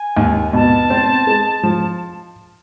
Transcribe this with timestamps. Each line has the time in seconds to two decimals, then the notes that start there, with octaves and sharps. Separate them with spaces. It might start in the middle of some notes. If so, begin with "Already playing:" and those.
Already playing: G#5
0.17 D#2
0.53 B2 A5
0.90 C4
1.27 G#3
1.63 F3